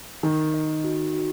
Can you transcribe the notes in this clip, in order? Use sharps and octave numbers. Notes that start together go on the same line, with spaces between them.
D#3 A#4
D#5
F#4
F#4